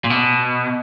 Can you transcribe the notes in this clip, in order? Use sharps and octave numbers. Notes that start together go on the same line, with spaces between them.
A#2
B2